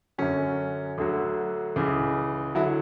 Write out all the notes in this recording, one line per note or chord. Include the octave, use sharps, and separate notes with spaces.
F#2 D3 F#3 C#4
D2 D3 F#3
C#2 C#3 E3
D3 F#3 E4